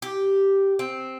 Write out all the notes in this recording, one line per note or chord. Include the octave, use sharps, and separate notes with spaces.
G4
C4